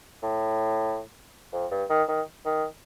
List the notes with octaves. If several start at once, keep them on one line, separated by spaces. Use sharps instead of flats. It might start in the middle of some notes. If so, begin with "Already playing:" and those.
A2
F2
G2
D#3
D#3
D#3